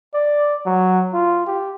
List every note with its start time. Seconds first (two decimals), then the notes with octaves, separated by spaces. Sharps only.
0.14 D5
0.66 F#3
1.13 F4
1.47 G4